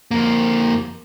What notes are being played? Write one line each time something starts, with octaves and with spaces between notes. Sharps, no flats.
F2 A#3